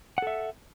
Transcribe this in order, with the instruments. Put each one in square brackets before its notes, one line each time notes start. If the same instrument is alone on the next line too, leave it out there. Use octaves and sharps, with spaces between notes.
[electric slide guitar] F#5
A4
E5